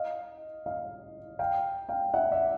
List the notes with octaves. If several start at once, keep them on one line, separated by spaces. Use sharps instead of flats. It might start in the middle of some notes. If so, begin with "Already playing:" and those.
Already playing: D#5 F5
D#5 F5
F5 G5
F5 G5
E5 F#5
D5 E5